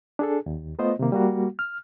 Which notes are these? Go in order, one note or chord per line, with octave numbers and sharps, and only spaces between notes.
D4 G#4 A4
D#2
A3 B3 F4 C5 D#5
C3 D#3 A#3
G3 A#3 F#4
F6